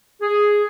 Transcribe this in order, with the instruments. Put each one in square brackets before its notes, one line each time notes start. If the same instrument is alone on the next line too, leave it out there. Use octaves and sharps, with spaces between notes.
[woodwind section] G#4